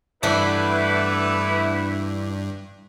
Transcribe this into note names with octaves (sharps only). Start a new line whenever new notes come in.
G2 E3 A3 B3 D4 E4 B4